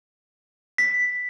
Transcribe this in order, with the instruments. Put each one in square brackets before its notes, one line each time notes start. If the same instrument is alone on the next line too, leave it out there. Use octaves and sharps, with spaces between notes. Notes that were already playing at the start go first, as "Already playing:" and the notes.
[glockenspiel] B6